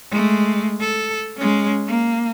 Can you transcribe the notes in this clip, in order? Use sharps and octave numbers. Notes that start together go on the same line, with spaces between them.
G#3 A3
A4
G#3 C#4
A#3